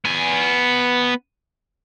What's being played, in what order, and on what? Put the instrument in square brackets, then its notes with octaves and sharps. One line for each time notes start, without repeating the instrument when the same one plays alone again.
[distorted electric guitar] B3 G#5